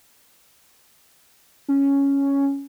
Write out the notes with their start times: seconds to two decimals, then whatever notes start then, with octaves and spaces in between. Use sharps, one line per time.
1.68 C#4